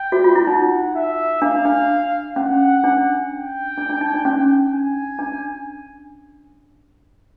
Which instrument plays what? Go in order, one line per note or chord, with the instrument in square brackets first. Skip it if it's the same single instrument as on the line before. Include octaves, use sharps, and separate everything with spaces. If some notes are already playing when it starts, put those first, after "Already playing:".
Already playing: [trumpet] G5
[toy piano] F#4
F4
E4
[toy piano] D#4 [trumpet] F#5
[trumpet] E5
[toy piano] D4 [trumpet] F5
[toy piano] D4
[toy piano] C#4 [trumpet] F#5
[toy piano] D4
[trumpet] G5
[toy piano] D4
D4
D#4
D4
C#4
[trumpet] G#5
[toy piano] D4